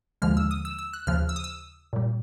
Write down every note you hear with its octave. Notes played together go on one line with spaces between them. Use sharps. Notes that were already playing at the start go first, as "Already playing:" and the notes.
D#2 D3 F3 G#3 F6
E6
D#6
E6
E6
F#6
D#2 C#3 F3 F6
E6
D#6
E6
A#2 G3